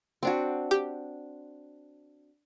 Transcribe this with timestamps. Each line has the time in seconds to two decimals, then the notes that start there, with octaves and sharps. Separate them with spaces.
0.23 C4 D4 F#4
0.71 G4